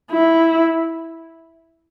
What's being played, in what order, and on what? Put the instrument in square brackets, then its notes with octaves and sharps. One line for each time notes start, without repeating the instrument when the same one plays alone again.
[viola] E4